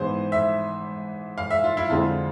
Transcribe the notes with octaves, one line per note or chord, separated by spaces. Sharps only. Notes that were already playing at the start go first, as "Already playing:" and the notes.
Already playing: G#2 E3 B3 C5
E5
F5
E5
F4
E4
F2 D3 G#3 C4 F4